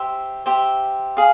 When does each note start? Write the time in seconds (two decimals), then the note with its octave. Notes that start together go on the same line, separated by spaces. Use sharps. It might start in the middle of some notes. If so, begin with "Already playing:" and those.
Already playing: G4 C5 E5
0.46 G4 C5 E5
1.17 G#4 F5